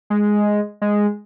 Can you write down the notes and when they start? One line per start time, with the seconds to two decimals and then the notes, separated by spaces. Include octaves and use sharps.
0.10 G#3
0.81 G#3